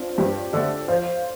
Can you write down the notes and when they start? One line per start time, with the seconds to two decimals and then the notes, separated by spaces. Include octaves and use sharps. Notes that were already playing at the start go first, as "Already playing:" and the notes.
Already playing: C4 D4 F4
0.18 G2 D4 G4
0.53 D3 A3 A4 D5
0.88 F3 C5 F5